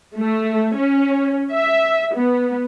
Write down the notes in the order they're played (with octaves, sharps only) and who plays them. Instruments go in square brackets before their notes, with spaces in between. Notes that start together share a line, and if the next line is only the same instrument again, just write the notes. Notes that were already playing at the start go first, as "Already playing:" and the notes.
[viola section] A3
C#4
E5
B3